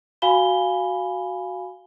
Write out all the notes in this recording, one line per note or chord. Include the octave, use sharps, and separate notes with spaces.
F#4 F5 G#5 B5 G7